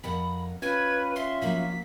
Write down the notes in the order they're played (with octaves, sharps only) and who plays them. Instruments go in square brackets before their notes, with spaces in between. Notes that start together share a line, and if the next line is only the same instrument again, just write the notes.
[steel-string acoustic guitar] F2 A#4 F#5 [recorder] B5
[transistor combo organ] C#4 F4 [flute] B4 [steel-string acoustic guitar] G5 [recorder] G#6
[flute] E5 [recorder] C6
[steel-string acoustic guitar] F3 F#3 A#3 [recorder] B6